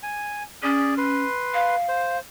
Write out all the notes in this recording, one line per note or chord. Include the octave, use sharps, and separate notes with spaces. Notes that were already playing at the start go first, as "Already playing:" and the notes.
G#5
C#4 G#4 D5
B4 C6
F5
C5